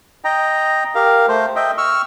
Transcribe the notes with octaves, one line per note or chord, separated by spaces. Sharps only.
D#5 G5 A#5
G4 A#4 F5
A3 C5
D#5 E5 G5
C#6 E6 F6